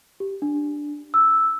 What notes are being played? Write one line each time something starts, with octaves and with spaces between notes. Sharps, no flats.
G4
D4
E6